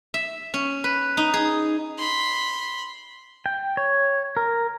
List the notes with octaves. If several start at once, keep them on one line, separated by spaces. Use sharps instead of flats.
E5
C#4
B4
D#4
G#4
B5 C6
G5
C#5
A#4